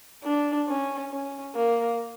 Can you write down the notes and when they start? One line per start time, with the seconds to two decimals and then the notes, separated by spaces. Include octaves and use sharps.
0.23 D4
0.68 C#4
1.11 C#4
1.55 A#3